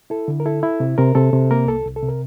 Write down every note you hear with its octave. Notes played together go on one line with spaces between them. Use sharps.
E4 A4
D3
A#4
E4 A4
E4
C3
C3 A#4
C3 A4
C3
A#3 A#4
C2 A4
C2
A4
C3
A#4